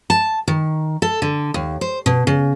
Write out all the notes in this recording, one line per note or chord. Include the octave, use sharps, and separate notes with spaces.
A5
D#3
A4
D3
D#2
C5
B2
C#3